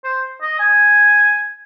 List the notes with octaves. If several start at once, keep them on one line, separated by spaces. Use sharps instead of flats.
C5
D#5
G#5